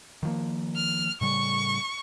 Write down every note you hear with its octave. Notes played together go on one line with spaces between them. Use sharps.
D#3 F3 A#3
F6
A2 C#3 G3 C#6